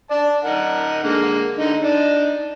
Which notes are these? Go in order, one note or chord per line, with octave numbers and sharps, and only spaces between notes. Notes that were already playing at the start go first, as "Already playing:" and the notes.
D5 A5
D#4 A#4 F#5
D3 G#3 A#3
D3 D#4
D4 D#4